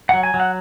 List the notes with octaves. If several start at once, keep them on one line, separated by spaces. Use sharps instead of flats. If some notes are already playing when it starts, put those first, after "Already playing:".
F#3 F#5
G#5
F#3
F#5